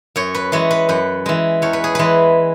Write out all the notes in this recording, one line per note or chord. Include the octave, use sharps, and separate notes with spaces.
F#2 C#5
B4
E3 G#3 C#5
B4
F#2 B4
E3 G#3
E2 C#5
B4
G#4
E3 G#3 B4